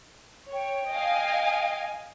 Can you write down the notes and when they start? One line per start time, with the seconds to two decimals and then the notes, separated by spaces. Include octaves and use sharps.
0.53 C#5 G5
0.92 D#5 F5 G#5